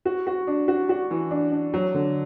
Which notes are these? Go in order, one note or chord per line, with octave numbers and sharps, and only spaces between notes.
F#4
F#4
D4
F#4
F#4
E3
D4
D4
F#3
D3